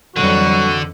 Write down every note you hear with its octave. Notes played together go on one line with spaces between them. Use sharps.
F2 D3 E3 F#3 G3 F#4